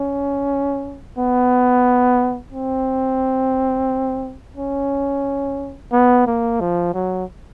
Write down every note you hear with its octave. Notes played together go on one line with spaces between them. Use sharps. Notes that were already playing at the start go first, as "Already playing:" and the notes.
Already playing: C#4
B3
C4
C#4
B3
A#3
F3
F#3